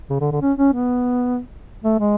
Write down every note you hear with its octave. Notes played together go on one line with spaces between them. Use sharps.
C#3
D3
D3
C#4
C#4
B3
A3
G#3